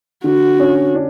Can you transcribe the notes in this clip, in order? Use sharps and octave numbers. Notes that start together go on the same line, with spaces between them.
D3 F#4
C#4
D4